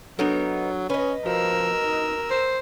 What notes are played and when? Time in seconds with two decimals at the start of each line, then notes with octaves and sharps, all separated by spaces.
0.19 F#3 B3 D4 D#4 A4 A#4
0.90 C#4 B4 D#5
1.26 F3 F#4 A#4 E6
1.82 D#4
2.31 C5